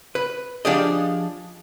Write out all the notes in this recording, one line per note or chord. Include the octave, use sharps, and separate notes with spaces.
B4
F3 D4 G4 G#4 D5 D#5